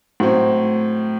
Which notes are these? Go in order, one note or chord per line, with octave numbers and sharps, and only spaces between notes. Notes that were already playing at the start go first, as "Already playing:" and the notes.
A2 F#3 C4